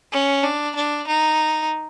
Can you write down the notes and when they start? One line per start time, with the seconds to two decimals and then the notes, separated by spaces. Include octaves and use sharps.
0.12 C#4
0.44 D4
0.76 D4
1.08 D#4